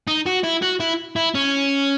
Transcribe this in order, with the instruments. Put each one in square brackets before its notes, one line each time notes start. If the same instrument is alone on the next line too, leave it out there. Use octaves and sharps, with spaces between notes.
[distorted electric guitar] D#4
F#4
E4
F#4
E4
E4
C#4